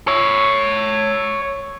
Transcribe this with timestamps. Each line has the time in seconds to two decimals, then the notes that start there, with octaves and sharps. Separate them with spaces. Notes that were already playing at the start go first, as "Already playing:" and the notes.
0.08 C#5 E5